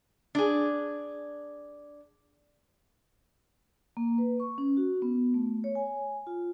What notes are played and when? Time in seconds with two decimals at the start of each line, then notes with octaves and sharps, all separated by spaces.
0.35 D4 G#4
3.97 A#3
4.18 B4
4.40 C#6
4.58 C#4
4.77 F#4
5.02 B3
5.34 A3
5.64 C#5
5.75 G#5
6.27 F4